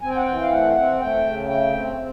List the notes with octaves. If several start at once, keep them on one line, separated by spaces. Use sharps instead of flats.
C4 G#5
G5
F#5
E3 G5
F5
A3 F#5
C4 F#5
A3 G5
C#3
A3 G5
C4
C4